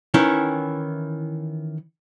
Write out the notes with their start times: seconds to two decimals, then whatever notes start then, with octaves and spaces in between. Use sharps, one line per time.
0.14 D#3 E3 C#4 E4